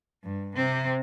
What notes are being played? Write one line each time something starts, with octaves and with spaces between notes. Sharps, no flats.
G2
C3 C4